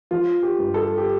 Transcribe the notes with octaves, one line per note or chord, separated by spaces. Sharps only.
F3 F4
G4
G2
A4
G4